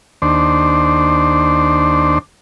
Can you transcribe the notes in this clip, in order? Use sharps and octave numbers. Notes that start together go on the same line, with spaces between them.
D#2 D4 C5